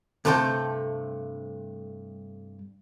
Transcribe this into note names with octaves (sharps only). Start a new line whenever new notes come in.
G2 C3 A3 A4 C5 G5